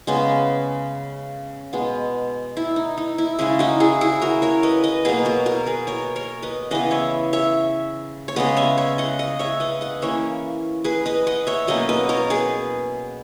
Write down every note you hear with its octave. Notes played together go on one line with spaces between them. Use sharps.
C#3 G#3 B3
B2 G#3 B3
E4
D#4
D#4
E4
C#3 G#3 C#4 E4 G#4
D#4 F#4
E4 G#4
E4 G#4
F#4 A#4
A#4 C#5
B4 D#5
B4 D#5
B2 F#3 A#3 G#4 B4
F#4 A#4
F#4 A#4
G#4 B4
A#4 C#5
A#4 C#5
B4 D#5
C#3 E3 B3 B4 D#5
C#5 E5
C#5 E5
C#5
C#3 G#3 B3 B4 D#5
C#5 E5
C#5 E5
D#5 F#5
D#5 F#5
C#5 E5
B4 D#5
D#5 F#5
E3 A#3 C#4 C#5 E5
G#4 B4
B4 D#5
D#5 F#5
C#5 E5
B2 F#3 A#3 C#4 D#5 F#5
B4 D#5
A#4 C#5
G#4 B4